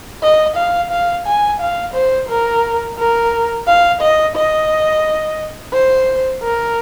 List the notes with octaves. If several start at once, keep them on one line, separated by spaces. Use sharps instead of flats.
D#5
F5
F5
G#5
F5
C5
A#4
A#4
F5
D#5
D#5
C5
A#4